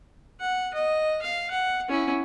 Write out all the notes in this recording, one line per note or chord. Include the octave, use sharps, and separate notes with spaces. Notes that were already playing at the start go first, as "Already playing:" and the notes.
F#5
D#5
F5
F#5
C#4 E4